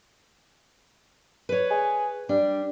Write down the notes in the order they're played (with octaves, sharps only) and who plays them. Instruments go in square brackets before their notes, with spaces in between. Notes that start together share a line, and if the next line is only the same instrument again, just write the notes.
[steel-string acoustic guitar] B4 C#5
[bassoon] G#4
[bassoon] G3 [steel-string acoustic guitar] D4